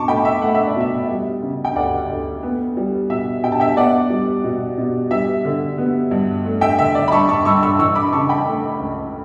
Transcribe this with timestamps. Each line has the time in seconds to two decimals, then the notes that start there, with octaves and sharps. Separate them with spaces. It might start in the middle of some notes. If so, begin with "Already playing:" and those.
Already playing: B2 A5 C#6 D6
0.08 A3 G5 B5
0.25 E5
0.42 A3 F#5
0.55 E5
0.67 D5
0.76 B2 E5
1.09 G3
1.42 C#3
1.65 G5
1.76 D2 D5 F#5
2.09 D2
2.43 B3
2.77 G3
3.10 B2 E5
3.43 B2 G5
3.52 A5
3.60 E5 G5
3.77 B3 D5 F#5
4.10 G3
4.44 B2
4.78 B2
5.11 G3 E5
5.45 D3
5.78 B3
6.11 G2
6.45 A3
6.61 E5 G5
6.79 D3 E5
6.95 D5
7.08 B5
7.12 G2 A5 C#6
7.29 A5 C#6
7.45 G2 C#6 E6
7.63 C#6 E6
7.79 E3 C#6 E6
7.95 B5 D6
8.12 C#3 A5 C#6
8.29 G5 B5
8.46 A3
8.80 C#2